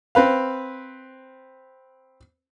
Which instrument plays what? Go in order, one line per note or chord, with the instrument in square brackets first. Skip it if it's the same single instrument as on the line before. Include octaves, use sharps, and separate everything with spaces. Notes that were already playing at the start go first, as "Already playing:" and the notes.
[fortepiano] C4 B4 F5